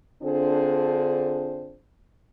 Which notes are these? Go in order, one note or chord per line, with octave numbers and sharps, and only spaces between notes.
D3 C4 D4 F4 G#4 C5